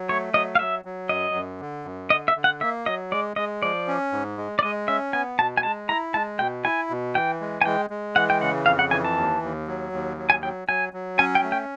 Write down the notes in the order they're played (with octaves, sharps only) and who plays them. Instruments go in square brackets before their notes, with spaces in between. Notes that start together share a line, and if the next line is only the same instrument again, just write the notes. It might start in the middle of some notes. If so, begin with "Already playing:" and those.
Already playing: [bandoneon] F#3
[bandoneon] A3 [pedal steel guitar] C#5
[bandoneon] F#3 [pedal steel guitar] D#5
[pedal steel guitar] F5
[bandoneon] F#3 [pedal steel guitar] E5
[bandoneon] F#3
[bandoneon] F#2 [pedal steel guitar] D#5
[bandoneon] F#2
D3
F#2
[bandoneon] D3 [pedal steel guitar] D#5
[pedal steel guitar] E5
[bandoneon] D3
[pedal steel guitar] F#5
[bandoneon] A#3 [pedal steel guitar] E5
[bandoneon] F#3 [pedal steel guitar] D#5
[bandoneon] G#3 [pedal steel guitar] D5
[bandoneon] G#3 [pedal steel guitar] D#5
[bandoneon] F3 [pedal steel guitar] D5
[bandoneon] C#4
G#2
G#3
[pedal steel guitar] D5
[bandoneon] G#3 [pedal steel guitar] D#5
[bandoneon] C#4 [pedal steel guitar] E5
[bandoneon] B3 [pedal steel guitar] G#5
[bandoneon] B2 [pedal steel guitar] A5
[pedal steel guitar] G#5
[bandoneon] G#3 [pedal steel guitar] A5
[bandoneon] E4 [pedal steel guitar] A#5
[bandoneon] G#3 [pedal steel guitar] A5
[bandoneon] B2 [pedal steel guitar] G5
[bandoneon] E4 [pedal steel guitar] G#5
[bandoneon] B2
[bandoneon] E3 [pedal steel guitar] G5
[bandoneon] G#3
[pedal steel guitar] G#5
[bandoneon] G#3 [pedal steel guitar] G5
[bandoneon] G#3
[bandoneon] E3 [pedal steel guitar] F#5
[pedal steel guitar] G5
[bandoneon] C#3 [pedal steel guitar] F#5
[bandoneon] F2 [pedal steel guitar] F5
[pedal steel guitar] F#5
[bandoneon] E3 [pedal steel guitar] G#5
[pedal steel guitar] A5
[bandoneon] D#2
D#2
F#3
D#2
F#3
[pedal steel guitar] G#5
[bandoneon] F#3 [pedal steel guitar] G5
[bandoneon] F#3 [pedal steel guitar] G#5
[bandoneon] F#3
[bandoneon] C#4 [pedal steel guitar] G#5
[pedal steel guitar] G5
[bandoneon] A3
[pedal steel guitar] G5